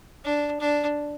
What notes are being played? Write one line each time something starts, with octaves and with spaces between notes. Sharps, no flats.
D4
D4